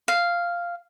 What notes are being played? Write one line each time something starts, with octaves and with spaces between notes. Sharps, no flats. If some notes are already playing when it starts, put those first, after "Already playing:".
F5